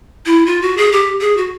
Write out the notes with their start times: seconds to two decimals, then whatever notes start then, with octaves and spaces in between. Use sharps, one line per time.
0.26 E4
0.46 F4
0.62 F#4
0.77 G#4
0.92 G4
1.21 G#4
1.37 F#4